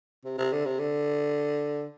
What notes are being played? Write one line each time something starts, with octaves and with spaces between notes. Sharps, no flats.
C3
C3
D3
C3
D3